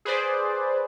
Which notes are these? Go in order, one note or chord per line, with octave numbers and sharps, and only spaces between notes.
G#4 B4 C5 D5